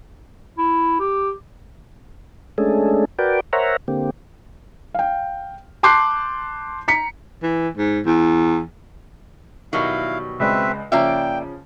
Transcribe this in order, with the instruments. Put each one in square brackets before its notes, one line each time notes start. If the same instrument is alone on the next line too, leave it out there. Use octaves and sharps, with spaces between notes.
[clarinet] E4
G4
[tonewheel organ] G#3 A3 C#4 D4 G#4 A4
F#4 A#4 B4 D5 G5
A#4 C5 C#5 E5 F#5 A#5
D3 A#3 C4 G4
[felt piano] F5 G5
A5 C6 D6 F#6 G6 C7
A#5 B6 C#7
[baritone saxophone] E3
G#2
E2
[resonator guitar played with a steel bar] B2 F#3 G3 [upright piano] D#3 [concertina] E4 F5
[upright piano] C#2 G#3 D5 [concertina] C4 B4 E5
[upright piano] C#3 F3 C#4 [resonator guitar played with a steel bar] A#3 D5 E5 [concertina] G5